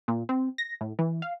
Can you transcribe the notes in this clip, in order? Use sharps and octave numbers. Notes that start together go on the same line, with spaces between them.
A#2
C4
A#6
A2
E3
F5